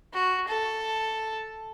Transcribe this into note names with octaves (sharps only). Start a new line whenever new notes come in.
F#4
A4